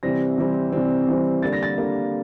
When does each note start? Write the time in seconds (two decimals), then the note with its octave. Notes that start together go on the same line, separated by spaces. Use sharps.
0.03 C3 E3 G3 C4 A#6
0.38 C3 E3 G3 C4
0.72 C3 E3 G3 C4
1.07 C3 E3 G3 C4
1.43 D3 G3 A#3 A6
1.53 A#6
1.63 A6
1.78 D3 G3 A#3